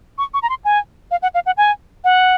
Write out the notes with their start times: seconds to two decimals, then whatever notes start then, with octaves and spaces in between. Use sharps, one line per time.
0.18 C#6
0.34 C#6
0.43 A#5
0.49 C6
0.65 G#5
1.11 F5
1.22 F#5
1.34 F5
1.46 F#5
1.57 G#5
2.04 F#5